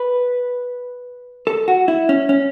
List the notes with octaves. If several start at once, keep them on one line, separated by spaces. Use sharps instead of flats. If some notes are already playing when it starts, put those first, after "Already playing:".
Already playing: B4
A4
F#4
E4
C#4
C#4